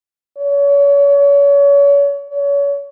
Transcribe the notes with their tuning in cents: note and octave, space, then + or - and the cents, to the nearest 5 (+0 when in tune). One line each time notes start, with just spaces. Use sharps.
C#5 +35
C#5 +30